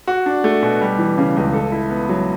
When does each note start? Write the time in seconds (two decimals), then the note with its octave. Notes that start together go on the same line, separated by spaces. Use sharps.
0.08 F#4
0.26 D4
0.44 A3
0.62 B2
0.81 G3
0.99 E3
1.18 C#3
1.36 C#2
1.53 A4
1.72 E4
1.90 B3
2.09 F#3